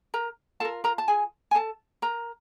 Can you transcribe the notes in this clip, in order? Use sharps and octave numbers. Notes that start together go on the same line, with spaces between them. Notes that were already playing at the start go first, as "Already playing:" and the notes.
A#4 A#5
F4 A4 A#4 A5
A#4 A#5
A5
G#4 G#5
G#5
A4 A5
A#4 A#5